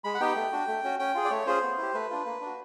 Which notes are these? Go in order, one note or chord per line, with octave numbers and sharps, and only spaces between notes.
G#3 B5
F#5
B3 D#4 G4 G5
A3
D4 F#4
A3
C#4 F#4
C#4 G5
F4 G#4
D5
A3 C#5
C#4 F4 G#4 C5
B3
E4 G4
A3 B4
D4 F4
A#3
D4 F#4